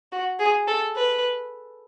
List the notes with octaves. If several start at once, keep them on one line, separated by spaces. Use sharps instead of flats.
F#4
G#4
A4
B4